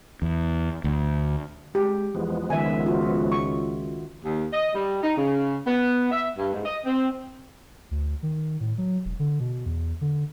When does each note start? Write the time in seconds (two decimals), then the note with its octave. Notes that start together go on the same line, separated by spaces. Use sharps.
0.22 E2
0.84 D2
1.75 G#3 G4
2.15 E2 F3 G#3 B3
2.50 C#2 D#3 E5 G#5
2.86 F4 F#4
3.32 C#6
4.24 D#2
4.52 D#5
4.74 G3
5.03 D#4
5.16 C#3
5.66 B3
6.11 E5
6.36 G2
6.53 G#2
6.65 D#5
6.85 C4
7.91 D2
8.23 D#3
8.60 A2
8.78 F#3
9.05 E1
9.19 D3
9.40 B2
9.66 E2
10.01 D3